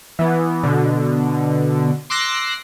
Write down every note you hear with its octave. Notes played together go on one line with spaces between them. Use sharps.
E3 B3
B2 D3
C6 D6 E6 F#6 A#6 C7